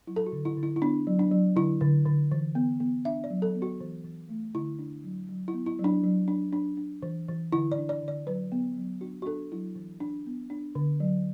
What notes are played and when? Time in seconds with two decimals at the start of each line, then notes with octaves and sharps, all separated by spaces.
0.07 F#3 E4
0.16 A4
0.27 F#4
0.32 D3
0.45 E4
0.57 D3
0.63 E4
0.76 E4
0.82 B3 D4
1.07 F#3
1.19 D4
1.31 F#3
1.56 D3 E4
1.81 D3
2.06 D3
2.32 E3
2.55 B3
2.80 B3
3.05 D4 E5
3.24 D5
3.30 F#3
3.42 A4
3.55 B3
3.62 F#4
3.81 E3
4.05 E3
4.29 A3
4.55 D3 E4
4.79 D4
5.04 F#3
5.29 F#3
5.48 E4
5.54 B3
5.66 E4
5.79 F#3
5.84 D4
6.03 F#3
6.28 D4
6.53 D4
6.77 D4
7.03 E3
7.28 E3
7.52 D3 E4
7.72 D5
7.78 D4
7.89 D5
8.02 D3
8.08 D5
8.27 F#3 B4
8.52 B3
8.77 F#3
9.01 D4 F#4
9.22 F#4
9.26 D4 A4
9.52 F#3 E4
9.75 E3
10.00 D4
10.26 B3
10.50 D4
10.75 D3
11.00 F#3